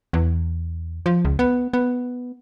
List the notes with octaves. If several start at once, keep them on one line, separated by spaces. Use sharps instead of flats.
E2
F3
C#2
B3
B3